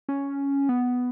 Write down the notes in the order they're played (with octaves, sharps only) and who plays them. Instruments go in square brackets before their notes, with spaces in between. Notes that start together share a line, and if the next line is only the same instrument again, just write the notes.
[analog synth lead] C#4
B3